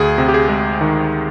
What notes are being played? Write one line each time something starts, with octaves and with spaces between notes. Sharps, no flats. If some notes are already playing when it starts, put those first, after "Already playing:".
Already playing: D2 G#4
C3
G4
G#4
G#3
D#3